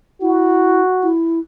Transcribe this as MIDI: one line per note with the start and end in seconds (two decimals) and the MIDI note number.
0.22 0.82 64
0.22 1.11 66
1.03 1.39 64